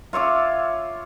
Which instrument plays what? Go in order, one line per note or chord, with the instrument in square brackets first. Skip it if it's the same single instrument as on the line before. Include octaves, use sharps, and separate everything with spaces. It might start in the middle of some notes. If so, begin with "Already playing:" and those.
[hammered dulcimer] F4 C#5 E5 D6